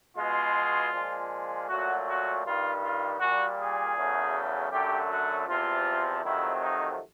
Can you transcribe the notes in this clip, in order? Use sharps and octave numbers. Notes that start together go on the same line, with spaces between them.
B2 G#3 F4
A#2 F3 G#3
A#2 F#3 A3 F#4
F#4
G2 D#3 G3 F4
F4
A#2 G3 F#4
G#4
E2 C#3 F#3 A3
F#2 D3 F#3 A3 G4
F#4
E2 C3 F3 F4
F2 C3 D#3 F#3 A3 E4
D#4